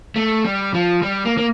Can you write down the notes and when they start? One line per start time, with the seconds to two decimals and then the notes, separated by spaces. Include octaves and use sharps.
0.16 A3
0.45 G3
0.74 F3
1.02 G3
1.25 A#3
1.38 A#3